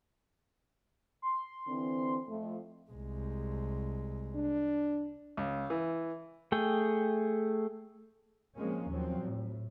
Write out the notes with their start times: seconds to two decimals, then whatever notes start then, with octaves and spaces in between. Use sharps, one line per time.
1.22 C6
1.68 D3 E3 C4
2.28 F2 A3
2.91 C2 G#3
4.35 D4
5.37 C#2
5.70 E3
6.52 A3 G#4 G5
8.56 F3 G#3 A#3 C4 C#4
8.90 D#2 F3 F#3 C4
9.22 A2